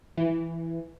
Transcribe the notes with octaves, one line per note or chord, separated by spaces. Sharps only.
E3